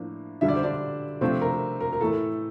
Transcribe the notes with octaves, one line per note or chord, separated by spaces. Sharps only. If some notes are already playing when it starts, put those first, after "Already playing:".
Already playing: A2 F3 A#3 D4
D3 G3 D4 E5
D5
C5
D4 D5
C3 F3 A3 C4 D4 C5
A#4
A#4
A#4
A2 E3 A3 A4